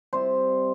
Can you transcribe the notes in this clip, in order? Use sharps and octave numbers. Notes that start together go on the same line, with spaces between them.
C3 G3 C5